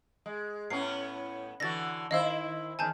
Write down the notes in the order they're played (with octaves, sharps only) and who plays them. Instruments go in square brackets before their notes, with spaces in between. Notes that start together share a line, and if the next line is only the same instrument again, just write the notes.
[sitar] G#3
[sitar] A2 B3 C#4 [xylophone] C7
[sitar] D3 E3 F#4 [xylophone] A6 A#6
[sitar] D#3 E4 C5 [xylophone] D#5 F5 E6
[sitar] E2 D#3 [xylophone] G#5 A5 G6